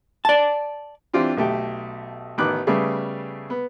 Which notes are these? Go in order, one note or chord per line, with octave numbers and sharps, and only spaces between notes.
D5 A5
E3 C4 D4 F4 G4
B1 A3 G4
A1 D#3 B3 D#4 D6 F#6
C#3 G3 A3 B3 G#4
B3